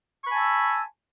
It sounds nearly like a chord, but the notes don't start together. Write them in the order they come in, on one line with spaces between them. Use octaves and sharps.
C#6 B5 G#5 A5 E6